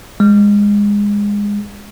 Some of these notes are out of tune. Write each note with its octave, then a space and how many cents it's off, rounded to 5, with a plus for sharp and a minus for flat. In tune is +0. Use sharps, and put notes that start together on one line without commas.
G#3 -20